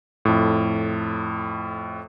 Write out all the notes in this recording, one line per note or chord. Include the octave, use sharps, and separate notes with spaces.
F2 A2